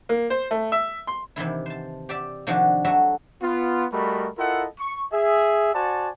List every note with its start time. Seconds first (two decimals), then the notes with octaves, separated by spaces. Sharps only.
0.09 A#3
0.30 C5
0.51 A3
0.72 E5
1.07 C6
1.36 C3 D#3 E3 E4
1.66 C5 A5
2.09 G4 D5 E5
2.47 C3 D#3 F3 D4 F#4 G#4
2.85 F#3 A3 F#4 E5
3.42 B3 F4
3.93 G3 A3 F#4 A#4 D#5 B5
4.38 E4 F4 A4 A#4 D#5 F#5
4.79 C#6
5.13 G#4 E5
5.74 F#4 C5 D5 F#5 G#5 A5